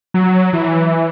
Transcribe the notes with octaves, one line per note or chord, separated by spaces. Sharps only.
F#3
E3